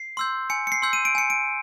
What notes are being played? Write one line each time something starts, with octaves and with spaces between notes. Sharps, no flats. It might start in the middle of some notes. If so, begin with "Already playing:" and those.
Already playing: C7
C6 E6 G6
G#5 C#7
C#7
C7
C6 E6 G6
D#7
D7
G#5 C#7
D7